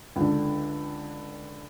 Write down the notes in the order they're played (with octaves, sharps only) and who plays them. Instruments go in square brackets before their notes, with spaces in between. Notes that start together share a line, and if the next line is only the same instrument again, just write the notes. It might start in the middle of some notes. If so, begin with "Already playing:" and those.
[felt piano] C#2 D3